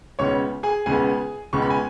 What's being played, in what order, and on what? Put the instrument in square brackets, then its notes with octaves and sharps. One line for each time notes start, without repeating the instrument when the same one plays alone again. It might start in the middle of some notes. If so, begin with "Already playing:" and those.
[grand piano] C#2 C#3 B3 C#5 C#6
G#4 G#5
C#2 C#3 B3 G#4 G#5
C#2 C#3 B3 C#6
B5
G#5